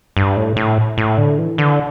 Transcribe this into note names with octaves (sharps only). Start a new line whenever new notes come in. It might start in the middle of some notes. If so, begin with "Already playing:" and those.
G2
A2
A2
A2
D3
E3
D3